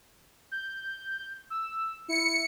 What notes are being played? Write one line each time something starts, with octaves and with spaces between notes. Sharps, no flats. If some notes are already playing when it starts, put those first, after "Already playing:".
G6
E6
E4 C#7